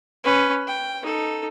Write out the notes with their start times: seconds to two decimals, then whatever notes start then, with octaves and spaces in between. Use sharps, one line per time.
0.24 C#4 B4
0.67 G5
1.02 D#4 A4